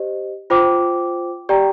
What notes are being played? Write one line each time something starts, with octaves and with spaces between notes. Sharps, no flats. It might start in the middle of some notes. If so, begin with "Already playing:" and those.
Already playing: G4 C5 D#5
F4 C5 G5 D6
G4 D5 G5 A#5